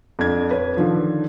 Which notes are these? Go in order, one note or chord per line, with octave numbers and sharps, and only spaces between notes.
F2 D4 G#6
B4 C#5
D3 D#3 F3